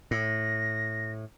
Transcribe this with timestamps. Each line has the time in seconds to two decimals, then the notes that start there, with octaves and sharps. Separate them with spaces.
0.11 A2 A#6